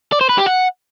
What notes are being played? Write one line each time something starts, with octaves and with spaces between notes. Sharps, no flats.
D5
C5
B4
G4
F#5